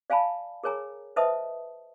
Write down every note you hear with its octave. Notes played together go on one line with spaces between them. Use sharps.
D5 F5 G#5 A5 B5
G#4 A#4 C#5 G#5 A#5
B4 C5 D#5 E5 A5 D#6